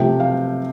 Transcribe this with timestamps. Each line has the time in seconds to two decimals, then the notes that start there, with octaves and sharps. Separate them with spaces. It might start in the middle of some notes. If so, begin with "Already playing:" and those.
Already playing: C3 F3 A3 G5
0.20 F5